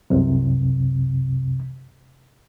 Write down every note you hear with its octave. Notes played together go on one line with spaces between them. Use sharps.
C2 F#2 C3